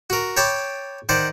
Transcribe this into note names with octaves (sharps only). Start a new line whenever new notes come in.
F#4 A#4
C#5 G5 A5 B5 D6
D#3 C5 D5 F#5